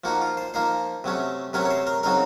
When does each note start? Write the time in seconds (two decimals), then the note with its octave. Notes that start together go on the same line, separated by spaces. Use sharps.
0.04 F3 A#3 D#4 F#4
0.21 F4
0.37 C5
0.54 F3 A#3 D#4 C5
1.04 C3 F#3 A3 C#4
1.53 C3 F#3 A3 C#4 A#4
1.65 C#5
1.71 C5
1.87 A#4
2.03 C#3 F#3 C4 D#4 A#4